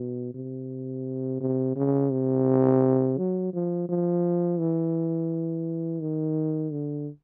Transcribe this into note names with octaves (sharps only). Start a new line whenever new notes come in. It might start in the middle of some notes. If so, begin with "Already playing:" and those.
Already playing: B2
C3
C3
C#3
C3
F#3
F3
F3
E3
D#3
D3